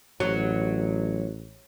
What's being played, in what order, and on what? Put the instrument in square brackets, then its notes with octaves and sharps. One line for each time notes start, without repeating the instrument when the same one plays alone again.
[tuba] A1 [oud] F#3